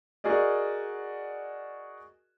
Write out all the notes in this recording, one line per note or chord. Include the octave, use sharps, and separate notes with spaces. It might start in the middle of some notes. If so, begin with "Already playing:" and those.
F#4 G#4 A#4 D5 D#5